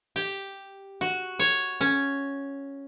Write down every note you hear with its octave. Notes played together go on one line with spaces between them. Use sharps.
G4
F#4
C#5
C#4